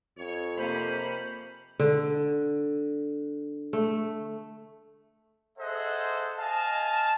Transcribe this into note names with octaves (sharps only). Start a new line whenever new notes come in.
F2 C#5
C3 A#3 C#4 C5 B5
D3
A3
G#4 A4 C5 D#5 E5 F#5
D#5 F5 G#5 A5